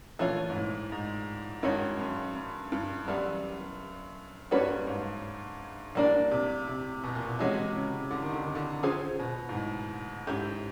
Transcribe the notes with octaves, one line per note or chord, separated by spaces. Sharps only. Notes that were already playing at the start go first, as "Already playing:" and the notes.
A#2 E3 A3 C#4 F4
G#2
A2
G#2
G2 D#3 G#3 C#4 F#4
F#2
F#2
G2
F#2 E3 G3 B3
G2 G3 A#3 C#4 F#4 B4
G#2
A2 G3 A#3 D4
C3
C3
B2
A#2
B2
C3 E3 G#3 C#4 F#4
C#3
D3
D#3
D3
D#3
D3
C#4 F4 G#4 C5
B2
G#2
A2
G#2 C#4 E4 G4